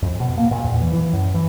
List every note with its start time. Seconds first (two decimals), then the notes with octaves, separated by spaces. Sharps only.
0.02 F2
0.20 B2
0.37 A#3
0.51 A#2
0.64 E2
0.82 E3
0.93 E3
1.13 F#2
1.34 E3